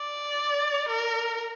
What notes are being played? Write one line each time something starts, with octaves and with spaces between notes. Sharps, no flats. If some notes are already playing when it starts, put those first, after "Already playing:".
Already playing: D5
A#4